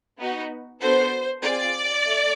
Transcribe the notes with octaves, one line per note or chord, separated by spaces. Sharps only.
B3 D#4 F#4
B3 D4 F#4 A4 C5
C4 F4 G#4 D5
A3